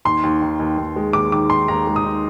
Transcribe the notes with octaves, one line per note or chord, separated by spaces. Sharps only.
D#2 C6
D#2
D#3
D#2
D#2
G#3
D#2 D6
D#3 D6
D#4 C6
D#2 A#5
G#3
D#6
D#4